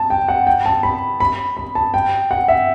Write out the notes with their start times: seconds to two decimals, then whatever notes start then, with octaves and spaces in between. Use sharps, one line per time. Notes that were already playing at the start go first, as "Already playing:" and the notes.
Already playing: A5
0.10 G5
0.28 F#5
0.47 G5
0.66 A5
0.83 B5
1.20 B5
1.57 B5
1.75 A5
1.94 G5
2.31 F#5
2.48 E5